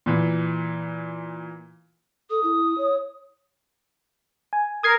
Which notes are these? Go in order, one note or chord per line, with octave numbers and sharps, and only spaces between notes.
A#2 E3
A4 D#6
E4
C#5
G#5
A#4 D#6 G#6 C7